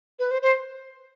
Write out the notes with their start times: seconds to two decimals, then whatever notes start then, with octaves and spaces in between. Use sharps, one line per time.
0.19 B4
0.31 C5
0.42 C5